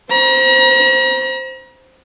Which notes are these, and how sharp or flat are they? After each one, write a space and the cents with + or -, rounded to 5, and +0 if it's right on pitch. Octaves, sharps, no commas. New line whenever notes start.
C5 +0 A#5 +40